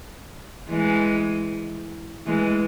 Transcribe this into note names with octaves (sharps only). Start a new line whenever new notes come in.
E3 G#3
E3 G#3